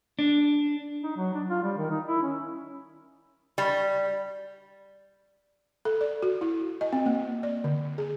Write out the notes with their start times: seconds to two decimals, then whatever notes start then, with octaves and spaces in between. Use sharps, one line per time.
0.19 D4
1.03 D#4
1.17 F#3
1.34 D4
1.49 F4
1.63 G3
1.78 D#3
1.90 D#4
2.07 E4
2.22 C#4
3.58 G3
5.85 A4
6.01 D5
6.23 F#4
6.41 E4
6.81 D#5
6.93 C4
7.06 A#3
7.43 D5
7.64 D3
7.98 G#4